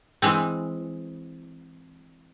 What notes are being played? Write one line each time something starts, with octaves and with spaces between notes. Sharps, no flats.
E3 G#3 C4